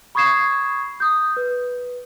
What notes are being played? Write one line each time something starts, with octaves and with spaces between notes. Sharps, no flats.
B5 C#6 D#6 G#6 C7 E7
D#6 G6
B4